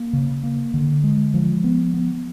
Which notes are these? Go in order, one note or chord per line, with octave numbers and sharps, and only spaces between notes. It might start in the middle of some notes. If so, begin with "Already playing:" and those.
Already playing: A#3
C#3
A#3
D3
G#3
F3
B3
B3